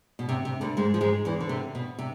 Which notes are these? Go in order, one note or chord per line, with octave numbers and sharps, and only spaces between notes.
B2
C3
C3
D2 D3
G#2 G#3
F3
G#2 G#3
E2 E3
D3
C3
B2
C3